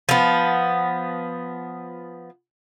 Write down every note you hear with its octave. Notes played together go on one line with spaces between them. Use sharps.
F3 B3